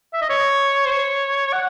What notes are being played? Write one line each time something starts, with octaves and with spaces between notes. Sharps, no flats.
E5
D#5
C#5
C5
C#5
F#5